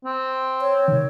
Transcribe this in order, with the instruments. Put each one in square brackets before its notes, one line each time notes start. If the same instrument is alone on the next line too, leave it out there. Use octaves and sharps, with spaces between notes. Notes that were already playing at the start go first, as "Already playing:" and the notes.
[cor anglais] C4
[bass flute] C#5
[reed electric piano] C3 D#3